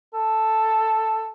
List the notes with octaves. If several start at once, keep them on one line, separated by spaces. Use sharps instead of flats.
A4